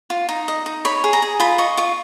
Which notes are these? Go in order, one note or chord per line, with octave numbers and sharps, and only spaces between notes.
F4
D#4
D#5
D#4
C#5 B5
G#4
A#5
G#4
F4 B5
D#5 C#6
F4 C#6